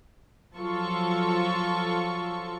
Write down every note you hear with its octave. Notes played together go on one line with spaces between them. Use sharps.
F3 F#3 F4 A4 C#6